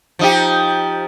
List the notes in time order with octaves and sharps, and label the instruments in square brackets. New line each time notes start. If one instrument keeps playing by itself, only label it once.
[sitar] F3 D#4 G4